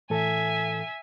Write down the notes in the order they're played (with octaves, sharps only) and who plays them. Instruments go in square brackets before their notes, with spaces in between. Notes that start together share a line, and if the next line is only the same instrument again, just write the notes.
[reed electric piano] A2 E3 A4 [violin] E5 G#5